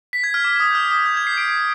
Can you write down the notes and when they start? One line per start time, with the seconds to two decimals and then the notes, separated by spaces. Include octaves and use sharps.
0.13 B6
0.24 G#6
0.34 F6
0.44 D6
0.60 D#6
0.70 G6
0.75 F6
0.91 D#6
1.06 G6
1.17 G#6
1.27 C7
1.37 D7